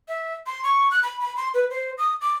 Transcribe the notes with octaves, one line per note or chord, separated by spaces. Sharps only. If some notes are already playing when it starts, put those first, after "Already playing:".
E5
C6
C#6
F#6
B5
B5
C6
B4
C5
D#6
D6